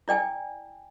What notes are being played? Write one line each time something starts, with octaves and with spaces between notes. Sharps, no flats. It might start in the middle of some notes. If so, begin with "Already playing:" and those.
E4 D5 G5 G#5